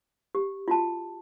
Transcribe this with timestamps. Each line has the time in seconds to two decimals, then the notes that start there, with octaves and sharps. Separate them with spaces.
0.35 G4
0.68 F4 F#4 A5